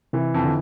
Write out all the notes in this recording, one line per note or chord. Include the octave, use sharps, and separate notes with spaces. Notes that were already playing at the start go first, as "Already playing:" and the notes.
C3 E3
F2
D3